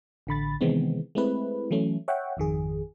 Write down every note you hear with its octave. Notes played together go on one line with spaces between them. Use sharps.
A1 D3 B5 A6
C3 D#3 E3 G#3 B3 C4
G#3 A3 C4 E4 B4
E3 F#3 A3 C#4
C#5 E5 F#5 G5
G#1 F2 D#3 G#4